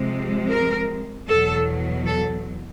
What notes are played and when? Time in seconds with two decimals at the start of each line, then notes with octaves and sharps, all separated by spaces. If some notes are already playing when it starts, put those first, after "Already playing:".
Already playing: C3 F3 G#3
0.51 A#4
1.28 E2 B2 F#3 A4
2.06 A4